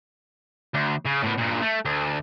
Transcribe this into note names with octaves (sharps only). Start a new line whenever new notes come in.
D2
C#3
A2 B3
G2 A#2
A3
D2